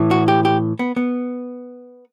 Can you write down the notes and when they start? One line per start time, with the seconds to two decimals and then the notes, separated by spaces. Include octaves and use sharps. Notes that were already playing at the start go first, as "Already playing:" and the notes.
Already playing: A2 E3
0.11 F#4
0.28 G4
0.45 G4
0.79 B3
0.96 B3